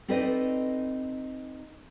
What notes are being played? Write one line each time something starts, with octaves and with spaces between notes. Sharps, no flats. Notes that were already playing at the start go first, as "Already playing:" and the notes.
C4 D#4 A4 B4 D5 D#5